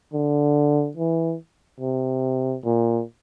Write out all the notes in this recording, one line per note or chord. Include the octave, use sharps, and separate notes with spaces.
D3
E3
C3
A#2